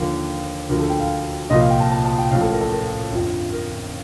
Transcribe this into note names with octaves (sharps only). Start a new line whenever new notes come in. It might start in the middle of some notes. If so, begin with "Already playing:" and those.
Already playing: D#2 D3 F3 A#4
D2 D3 F3 A#4
A4
G5
F5
C2 A#2 F3 D#5
F5
G5
A5
A5
A5
G5
A1 A2 F3 F5
A4
A#4
A4
A#4
G1 F2 D3 F3
A#4